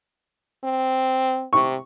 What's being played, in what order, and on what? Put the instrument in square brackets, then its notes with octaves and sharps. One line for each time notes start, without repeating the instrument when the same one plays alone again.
[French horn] C4
[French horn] C3 [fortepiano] C#6